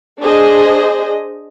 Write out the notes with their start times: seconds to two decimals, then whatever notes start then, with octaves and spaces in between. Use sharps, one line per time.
0.20 D4 G#4 C5 D#5